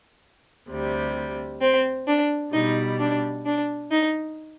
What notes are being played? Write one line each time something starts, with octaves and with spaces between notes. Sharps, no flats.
D2 C3 G3
C4
D4
B2 G3 D#4
D4
D4
D#4